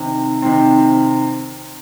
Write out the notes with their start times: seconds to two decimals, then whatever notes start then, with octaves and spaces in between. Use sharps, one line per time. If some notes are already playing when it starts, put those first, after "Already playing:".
Already playing: C3 D#3 C4
0.42 C3 D#3 C4